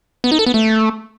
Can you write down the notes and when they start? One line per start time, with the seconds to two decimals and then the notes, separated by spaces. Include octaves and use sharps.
0.24 B3
0.31 D#4
0.39 A4
0.46 B3
0.54 A3